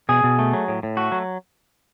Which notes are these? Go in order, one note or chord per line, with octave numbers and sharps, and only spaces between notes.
B2 G#4
B2
A3
F#3
A2
A2
A3 F#4
F#3